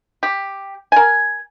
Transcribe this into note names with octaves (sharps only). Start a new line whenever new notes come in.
G4
A#4 G#5